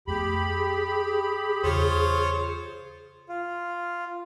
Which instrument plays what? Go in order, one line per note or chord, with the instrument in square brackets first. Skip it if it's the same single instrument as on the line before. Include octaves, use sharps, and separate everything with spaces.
[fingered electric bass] F2 A3 B3 [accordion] G4 B5 [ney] G#4
[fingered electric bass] E2 C#3 [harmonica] F4 C5 C#5
[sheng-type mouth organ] F4